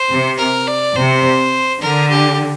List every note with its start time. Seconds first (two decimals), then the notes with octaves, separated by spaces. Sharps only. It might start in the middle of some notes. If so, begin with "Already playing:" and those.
Already playing: C5
0.09 C3
0.38 A#4
0.67 D5
0.95 C3 C5
1.81 D3 A#4
2.10 G4